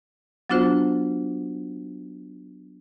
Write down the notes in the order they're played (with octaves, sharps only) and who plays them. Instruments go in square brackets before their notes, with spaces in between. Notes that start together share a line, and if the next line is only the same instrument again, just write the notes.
[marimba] F#3 B3 D4 F4 F#4 C5